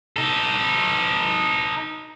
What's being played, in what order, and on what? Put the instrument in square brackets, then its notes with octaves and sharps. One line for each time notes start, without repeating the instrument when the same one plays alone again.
[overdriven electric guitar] D#4 A4